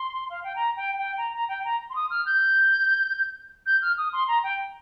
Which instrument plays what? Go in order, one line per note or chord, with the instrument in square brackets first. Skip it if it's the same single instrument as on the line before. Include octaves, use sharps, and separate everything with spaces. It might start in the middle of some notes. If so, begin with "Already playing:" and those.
Already playing: [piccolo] C6
F5
G5
A#5
G5
G5
A#5
A#5
G5
A#5
C6
D#6
F6
G6
G6
F6
D#6
C6
A#5
G5